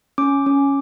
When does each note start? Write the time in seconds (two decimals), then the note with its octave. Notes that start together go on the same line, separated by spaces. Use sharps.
0.18 C#4 D6
0.46 C#4